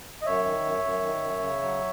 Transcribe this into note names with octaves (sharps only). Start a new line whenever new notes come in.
D#5
F#2 C#5 E5
D#3
F#2
F#2
D#3
F#2
C#3
F#3